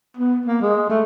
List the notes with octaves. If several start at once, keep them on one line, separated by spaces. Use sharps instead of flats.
B3
A#3
G#3
A3